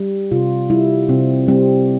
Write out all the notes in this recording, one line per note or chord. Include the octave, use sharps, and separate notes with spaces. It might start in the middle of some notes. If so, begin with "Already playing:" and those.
Already playing: G3
C3 F4
G3 E4
C3 C4
G3 C4